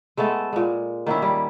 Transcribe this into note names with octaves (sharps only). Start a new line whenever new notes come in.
G#3 A3 B3 A4
A#2 G#3
D#3 A#3 C#4 E4
G3